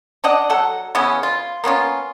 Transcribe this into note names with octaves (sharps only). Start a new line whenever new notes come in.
D4 D5 D#5 F#5
F#3 A4 F#5
C#3 E3 B3 C#4
F4
A#3 B3 C#4 F4